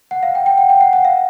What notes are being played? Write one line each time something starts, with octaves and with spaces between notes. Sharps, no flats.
F#5
F5
G5
G5
F#5
G5
F#5
F#5
F5